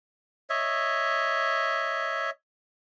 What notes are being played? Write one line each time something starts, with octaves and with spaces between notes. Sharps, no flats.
C#5 D#5 E5